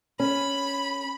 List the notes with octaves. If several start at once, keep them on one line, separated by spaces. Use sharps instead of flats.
C#4 B5